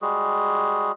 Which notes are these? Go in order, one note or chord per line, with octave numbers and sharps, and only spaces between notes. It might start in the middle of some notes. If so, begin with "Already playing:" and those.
G3 G#3 F#4 G#4